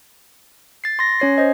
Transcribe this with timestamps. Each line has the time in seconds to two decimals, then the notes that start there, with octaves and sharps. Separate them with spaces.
0.84 A6 C7
0.99 C6 A#6
1.20 C#4 C#5 C7
1.38 C5 D#5